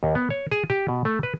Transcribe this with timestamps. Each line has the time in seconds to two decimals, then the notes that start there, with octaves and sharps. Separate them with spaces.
0.03 D#2
0.15 B3
0.30 C#5
0.51 G#4
0.70 G4
0.88 B2
1.05 A3
1.23 B4